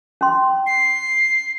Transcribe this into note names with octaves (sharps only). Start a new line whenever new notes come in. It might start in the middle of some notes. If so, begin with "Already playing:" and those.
C#4 C6
C7